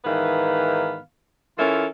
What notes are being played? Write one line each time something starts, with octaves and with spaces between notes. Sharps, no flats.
G#2 D#3 E3 B3 B4 F5
E3 C#4 E4 F4 A4 A#4